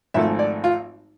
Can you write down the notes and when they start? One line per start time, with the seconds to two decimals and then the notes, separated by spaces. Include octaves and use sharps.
0.14 G#1 G#2 F3 A3 E5
0.39 D5
0.64 F4